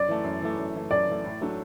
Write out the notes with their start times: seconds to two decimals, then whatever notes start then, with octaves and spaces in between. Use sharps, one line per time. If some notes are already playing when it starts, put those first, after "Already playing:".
Already playing: F#2 D5
0.08 E3 A3
0.24 F#2
0.42 E3 A3
0.58 F#2
0.75 E3 A3
0.91 F#2 D5
1.08 E3 A3
1.24 A2
1.41 F#3 A3 D4